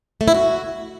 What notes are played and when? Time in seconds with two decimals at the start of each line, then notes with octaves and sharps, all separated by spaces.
0.21 A3
0.28 E4
0.34 F#4